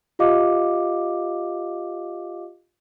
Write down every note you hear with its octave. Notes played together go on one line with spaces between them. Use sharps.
F4 G4 D#5 F5 D6